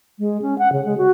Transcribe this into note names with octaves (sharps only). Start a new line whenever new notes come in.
G#3
C#4
F#5
C#3
G#3
F#4